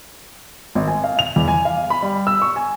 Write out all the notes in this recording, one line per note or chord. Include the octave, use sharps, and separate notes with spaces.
G#1
G#5
F5
F7
E2
G#5
F5
B5
G3
E6
C#6
G#5